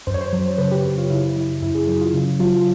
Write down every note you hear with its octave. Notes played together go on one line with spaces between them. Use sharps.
F#2 C5
C#5
C5
F#3
C5
C#3 B4
G4
F#2
F4
C#3 E4
F#3 E4
F#2 E4
G#4
F#3 G#4
F4
C#3
F#3 F4